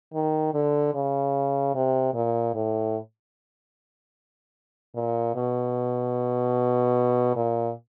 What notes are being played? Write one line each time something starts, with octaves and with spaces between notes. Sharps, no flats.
D#3
D3
C#3
C3
A#2
A2
A#2
B2
A#2